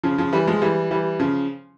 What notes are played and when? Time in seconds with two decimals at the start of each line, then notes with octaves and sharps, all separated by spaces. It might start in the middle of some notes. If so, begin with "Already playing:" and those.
0.03 C#3 F3
0.18 C#3 F3
0.33 E3 G3
0.47 F3 G#3
0.62 E3 G3
0.91 E3 G3
1.20 C#3 F3